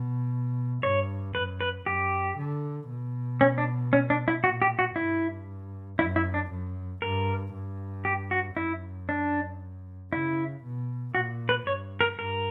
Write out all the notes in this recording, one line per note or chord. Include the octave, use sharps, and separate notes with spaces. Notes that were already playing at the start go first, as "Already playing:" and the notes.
Already playing: B2
G2 C#5
F#2 B4
B4
F#2 G4
D3
B2
C#4
D4
C#4
D4
E4
A#2 F#4
G4
F#4
G2 E4
F#2 E4
E4
D4
F#2
G2 A#4
G2
G4
F#4
F#2 E4
D4
C#3 E4
B2
A#2 F#4
B4
G2 C#5
A#4
G2 A#4